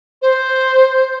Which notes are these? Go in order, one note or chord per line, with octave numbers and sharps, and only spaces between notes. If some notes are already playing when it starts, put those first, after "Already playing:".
C5